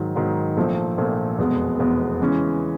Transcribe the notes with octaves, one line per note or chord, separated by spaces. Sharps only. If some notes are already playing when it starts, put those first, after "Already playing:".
Already playing: G#2 D#3 F#3
G#2 D#3 F#3
A#1 A#2 F3 A3
A#1 A#2 F3 A3
F1 E2 B2 G#3 B3
F1 E2 B2 G#3 B3
C#3 E3 G#3 C#4